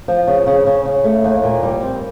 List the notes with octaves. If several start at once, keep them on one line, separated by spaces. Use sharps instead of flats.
F3
C#3
C#3
C#3
C#3
A3
D#2
A#2
G3
C4